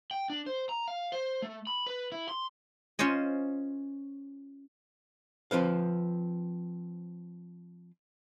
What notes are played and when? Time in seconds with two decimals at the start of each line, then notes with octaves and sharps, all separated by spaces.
0.11 G5
0.30 D4
0.46 C5
0.69 A#5
0.88 F5
1.12 C5
1.42 A3
1.67 B5
1.87 B4
2.12 E4
2.29 C6
2.99 C#4 F4 C5 C#5 D#5
5.51 F3 C4 B4 F5